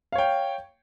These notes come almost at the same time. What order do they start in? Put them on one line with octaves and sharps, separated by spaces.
F5 C#5 G5